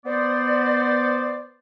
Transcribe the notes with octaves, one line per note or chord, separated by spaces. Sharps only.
B3 C5 D5